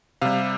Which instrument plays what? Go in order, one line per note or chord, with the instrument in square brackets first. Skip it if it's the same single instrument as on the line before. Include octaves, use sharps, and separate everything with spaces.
[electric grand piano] C3 G3 F5